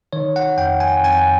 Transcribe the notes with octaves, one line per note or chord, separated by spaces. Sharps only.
D#3 C#5
F#5
F2 G5
G#5
F2 G#5